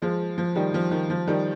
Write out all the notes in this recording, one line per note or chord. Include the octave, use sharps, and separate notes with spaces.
F3 G#3
F3
D#3 G3
F3
D#3
F3
D#3 G3